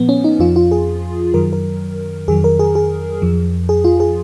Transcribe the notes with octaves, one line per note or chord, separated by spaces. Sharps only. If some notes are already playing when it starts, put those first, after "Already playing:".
Already playing: A#2 F3 B3
C#4
D#4
F2 F3 F4
F4
G#4
F#2 D#3 F#3 A#4
A#4
F2 D#3 F#3 G#4
A#4
G#4
G#4
F2 F3
G#4
F4
G#4